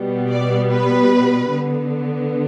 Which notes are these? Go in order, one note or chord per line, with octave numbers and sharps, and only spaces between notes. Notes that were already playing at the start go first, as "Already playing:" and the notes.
Already playing: B2 G3 B3
D5
B4
D3 B3